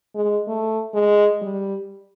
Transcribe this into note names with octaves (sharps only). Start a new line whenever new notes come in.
G#3
A3
G#3
G3